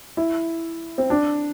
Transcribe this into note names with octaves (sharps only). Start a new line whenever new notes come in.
E4
C4
D4